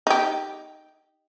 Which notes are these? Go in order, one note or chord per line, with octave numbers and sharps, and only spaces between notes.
D#4 G4